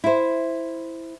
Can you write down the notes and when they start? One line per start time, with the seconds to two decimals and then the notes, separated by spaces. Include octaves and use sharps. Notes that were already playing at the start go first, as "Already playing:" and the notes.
0.04 E4 C5